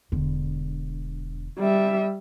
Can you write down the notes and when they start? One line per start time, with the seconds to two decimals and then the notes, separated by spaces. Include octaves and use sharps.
0.12 E1 D3
1.59 G3 E5